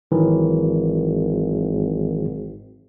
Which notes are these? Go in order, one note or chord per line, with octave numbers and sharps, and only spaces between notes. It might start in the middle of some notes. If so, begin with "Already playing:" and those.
G#1 D#3 E3 F#3